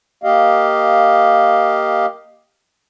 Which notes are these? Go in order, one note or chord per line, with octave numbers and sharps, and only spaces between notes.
A#3 G4 D#5 F5